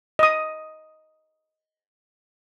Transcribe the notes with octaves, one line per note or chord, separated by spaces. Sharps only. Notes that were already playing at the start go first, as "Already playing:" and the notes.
D#5 D#6